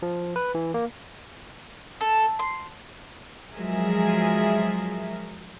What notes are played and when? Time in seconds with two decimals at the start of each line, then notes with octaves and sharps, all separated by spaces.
0.02 F3
0.36 B4
0.55 E3
0.74 A#3
2.01 A4
2.39 C6
3.53 F3 F#3 G#3 G#4 A#4 E5